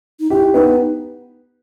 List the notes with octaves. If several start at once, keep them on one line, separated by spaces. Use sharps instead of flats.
D#4
E4 G4
B3 D#4